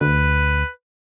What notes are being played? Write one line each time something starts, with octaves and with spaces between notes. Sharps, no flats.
D2 B4